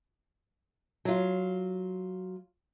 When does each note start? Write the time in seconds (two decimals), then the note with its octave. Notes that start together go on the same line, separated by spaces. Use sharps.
1.05 F#3 F4